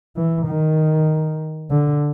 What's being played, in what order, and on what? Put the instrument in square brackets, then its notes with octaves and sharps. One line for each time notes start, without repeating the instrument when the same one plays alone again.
[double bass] E3
D#3
D3